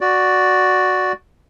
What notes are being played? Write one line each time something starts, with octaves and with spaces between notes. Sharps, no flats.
F#4 D5